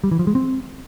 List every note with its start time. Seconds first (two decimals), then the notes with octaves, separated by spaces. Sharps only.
0.04 G3
0.11 E3
0.19 F3
0.27 G#3
0.35 C4